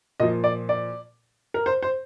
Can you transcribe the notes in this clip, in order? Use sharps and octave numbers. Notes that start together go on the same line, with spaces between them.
A#2 F3 D#5
D5
D5
A#4
C5
C5